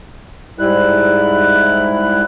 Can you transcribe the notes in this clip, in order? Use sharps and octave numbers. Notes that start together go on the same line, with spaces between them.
G#2 G3 E4 F#6